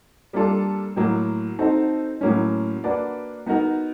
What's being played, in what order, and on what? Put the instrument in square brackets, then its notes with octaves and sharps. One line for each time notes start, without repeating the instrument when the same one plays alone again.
[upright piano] G3 A#3 D4 F4 A4
A2 F#3 A#3
C4 D#4 F#4 A4
A2 F#3 A#3 C#4
A#3 D4 F#4 B4 D5
B3 D#4 F#4 A#4